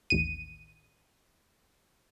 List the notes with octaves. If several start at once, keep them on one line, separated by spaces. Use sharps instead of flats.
A1 D#2 D#7